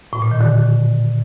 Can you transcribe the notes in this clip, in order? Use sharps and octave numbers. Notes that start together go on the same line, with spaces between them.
A2
A#2
D#3
D3